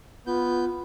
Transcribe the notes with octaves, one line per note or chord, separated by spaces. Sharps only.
B3 F4 G6